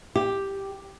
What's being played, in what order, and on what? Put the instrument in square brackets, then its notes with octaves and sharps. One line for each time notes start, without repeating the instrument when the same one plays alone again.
[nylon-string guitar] G4